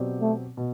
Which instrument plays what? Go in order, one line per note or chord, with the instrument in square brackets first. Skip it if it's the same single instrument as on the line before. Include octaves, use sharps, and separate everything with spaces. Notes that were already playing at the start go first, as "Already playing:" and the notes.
Already playing: [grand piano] B2 F#3 C4 G4 D5
[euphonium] A3
[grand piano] B2